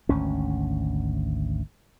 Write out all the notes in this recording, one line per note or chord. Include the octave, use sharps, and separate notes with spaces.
G#1 D2 C#4